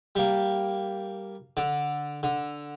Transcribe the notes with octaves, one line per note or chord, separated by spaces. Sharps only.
G3 A#3
D3 D5
D3